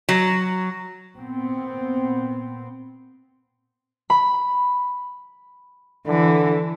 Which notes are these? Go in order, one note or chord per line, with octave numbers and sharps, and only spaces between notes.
F#3
A#2 B3 C4
B5
D3 E3